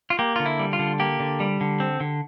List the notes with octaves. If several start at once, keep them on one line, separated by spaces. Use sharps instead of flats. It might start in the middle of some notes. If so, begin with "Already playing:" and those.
F4
A#3 G4
D3 F4
E4
G3
F4
D3
A#3 G4
D3
G3
D3
C4
D3